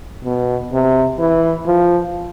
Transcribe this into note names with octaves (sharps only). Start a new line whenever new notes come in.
B2
C3
E3
F3